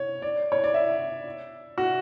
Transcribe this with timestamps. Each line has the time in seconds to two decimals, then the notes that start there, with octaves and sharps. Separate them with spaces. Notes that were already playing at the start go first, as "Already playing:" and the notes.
Already playing: C#5
0.22 D5
0.52 C#5
0.64 D5
0.74 E5
1.78 F#4